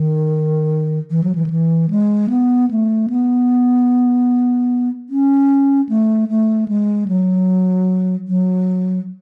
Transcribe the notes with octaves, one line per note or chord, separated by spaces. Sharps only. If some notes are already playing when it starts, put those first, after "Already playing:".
Already playing: D#3
E3
F#3
E3
D#3
E3
G#3
B3
A3
B3
C#4
A3
A3
G#3
F#3
F#3